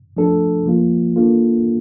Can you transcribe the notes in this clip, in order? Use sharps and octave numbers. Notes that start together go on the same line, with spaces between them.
F3 A3 D4 A4
F3 A#3 F4
E3 A#3 D4 F4 A4